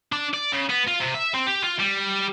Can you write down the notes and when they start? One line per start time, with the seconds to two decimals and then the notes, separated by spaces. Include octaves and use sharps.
0.13 D4
0.34 D5
0.52 C#3
0.70 B3
0.87 F4
1.00 C3
1.14 E5
1.34 C4
1.47 G4
1.64 F4
1.80 G3